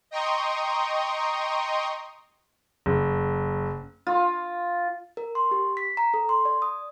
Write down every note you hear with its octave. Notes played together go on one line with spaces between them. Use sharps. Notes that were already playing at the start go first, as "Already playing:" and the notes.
D#5 G5 A#5 C6 C#6 D#6
F#1
F4
A#4
C6
G4
B6
A#5
A4
C6
D5
D#6